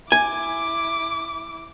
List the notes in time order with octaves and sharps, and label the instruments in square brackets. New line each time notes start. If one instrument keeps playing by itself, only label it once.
[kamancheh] E4 D6 [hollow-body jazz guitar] G#5